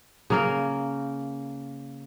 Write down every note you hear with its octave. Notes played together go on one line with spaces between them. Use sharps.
C#3 A#3 A#4